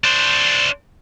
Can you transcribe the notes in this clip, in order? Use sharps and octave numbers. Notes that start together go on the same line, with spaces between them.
D4 C5